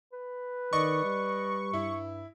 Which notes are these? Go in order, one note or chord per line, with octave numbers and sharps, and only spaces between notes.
B4
D#3 D5 D#5 C#6
G3
G2 E4